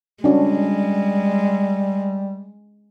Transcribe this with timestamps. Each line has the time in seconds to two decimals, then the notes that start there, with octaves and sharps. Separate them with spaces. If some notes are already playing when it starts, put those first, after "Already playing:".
0.24 G3 G#3 C#4 D4 F#4